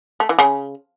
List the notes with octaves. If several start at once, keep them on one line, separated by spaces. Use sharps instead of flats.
A3
E3
C#3